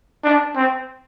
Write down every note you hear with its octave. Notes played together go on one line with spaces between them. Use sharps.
D4
C4